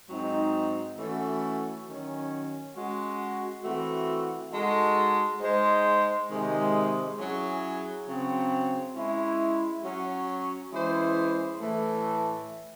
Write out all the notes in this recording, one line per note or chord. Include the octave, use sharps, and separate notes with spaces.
G#2 F#3 C4 D#4
E3 A3 C#4 F#4 A4
D#3 F#3 C#4
G#3 C#4 F#4
E3 A3 C4 F#4
G#3 D#4 F#4 A4
G#3 D#4 G#4 C5
C3 D#3 G#3
F#3 C#4 E4 G#4
C#3 F#3 C4
G#3 C#4 E4
F#3 C#4 F#4
E3 G#3 C#4 E4 C5
A2 E3 A3